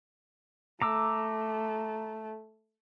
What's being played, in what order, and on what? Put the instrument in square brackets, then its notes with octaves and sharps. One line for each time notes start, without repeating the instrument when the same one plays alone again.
[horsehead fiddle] A3 [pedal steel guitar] A#5 D6 E6